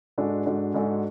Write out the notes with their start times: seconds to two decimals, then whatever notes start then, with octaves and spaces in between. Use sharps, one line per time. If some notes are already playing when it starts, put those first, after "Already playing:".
0.18 G#2 G#3 D4 F#4 A4
0.46 G#2 G#3 D4 F#4 A4
0.74 G#2 G#3 D4 F#4 A4